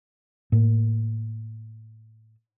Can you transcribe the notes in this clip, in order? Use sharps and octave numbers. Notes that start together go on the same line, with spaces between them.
A2 A#3